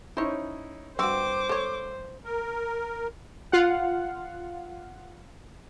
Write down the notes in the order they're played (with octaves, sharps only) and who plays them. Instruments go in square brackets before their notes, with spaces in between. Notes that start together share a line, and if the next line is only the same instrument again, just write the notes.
[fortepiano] C#4 D#4 E4 [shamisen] C5 C#5
[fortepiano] G2 E6 [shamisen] C4 F#4 [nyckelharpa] C5 [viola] D6
[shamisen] A4 C#5
[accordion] A#4
[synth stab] F4 F5 F#5